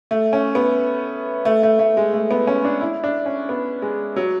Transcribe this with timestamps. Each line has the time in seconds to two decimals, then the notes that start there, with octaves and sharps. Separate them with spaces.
0.11 A3
0.33 C#4
0.55 B3
1.45 A3
1.63 A3
1.79 A3
1.97 G#3
2.14 A3
2.31 B3
2.47 C#4
2.65 D4
2.81 E4
3.04 D4
3.26 C#4
3.49 B3
3.82 G#3
4.16 F#3